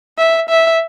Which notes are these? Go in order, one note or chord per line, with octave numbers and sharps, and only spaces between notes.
E5
E5